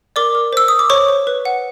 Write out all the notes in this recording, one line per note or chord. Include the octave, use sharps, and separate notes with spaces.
A#4 D5 D6
A#4
C5 E6
C5 D#6
D6
C5 C#5 C#6
C5
B4
F#5